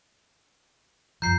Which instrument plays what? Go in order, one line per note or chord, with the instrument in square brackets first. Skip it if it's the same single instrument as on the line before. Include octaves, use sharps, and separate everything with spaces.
[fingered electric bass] F#2 F3 [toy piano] A#5 [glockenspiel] G6 C7